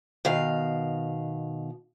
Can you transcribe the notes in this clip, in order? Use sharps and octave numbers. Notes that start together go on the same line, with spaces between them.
B2 D#3 F5